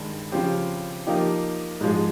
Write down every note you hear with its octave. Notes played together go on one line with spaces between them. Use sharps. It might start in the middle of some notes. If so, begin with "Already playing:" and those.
Already playing: G2 D#3 G#3
C#3 F3 C4 G4
F3 A#3 D#4 G4
G#2 F3 G#3